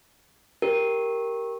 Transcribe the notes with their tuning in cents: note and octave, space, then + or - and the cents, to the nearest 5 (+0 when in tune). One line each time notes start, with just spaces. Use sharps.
G4 +0 A#4 +0